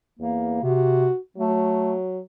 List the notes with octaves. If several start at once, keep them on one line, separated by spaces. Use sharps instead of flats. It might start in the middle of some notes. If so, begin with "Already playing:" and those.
E2 A#3
C3 F#4
F#3 A3